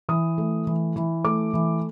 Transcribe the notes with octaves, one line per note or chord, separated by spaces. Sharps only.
E3 D#6
A3
E3
E3
A3 D6
E3